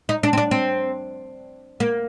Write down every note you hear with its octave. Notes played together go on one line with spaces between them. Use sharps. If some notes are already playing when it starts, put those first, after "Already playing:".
D#4
D4
C4
D4
C4
A#3